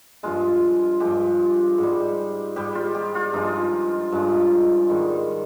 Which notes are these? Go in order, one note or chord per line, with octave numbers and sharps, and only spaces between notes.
G2 F3 G#3 F4
G2 F3 G#3 G4
G#2
G3
G#2 G3 G4
F4
G4
F4
G2 F3 G#3 D#4
G2 F3 G#3
G#2 D#3 G3